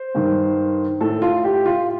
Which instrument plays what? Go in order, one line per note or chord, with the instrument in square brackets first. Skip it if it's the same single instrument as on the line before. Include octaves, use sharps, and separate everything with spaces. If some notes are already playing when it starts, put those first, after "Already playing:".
Already playing: [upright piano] C5
G2 D#3
A2 A4
F4
G4
F4